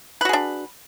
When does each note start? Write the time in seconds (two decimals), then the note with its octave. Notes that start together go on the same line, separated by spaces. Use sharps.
0.21 B4
0.25 F#4
0.29 G#4
0.33 D4